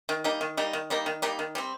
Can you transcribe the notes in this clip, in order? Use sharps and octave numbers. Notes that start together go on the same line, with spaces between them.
D#3
G3 A#3 D#4
D#3
G3 A#3 D#4
D#3
G3 A#3 D#4
D#3
G3 A#3 D#4
D#3
G3 C4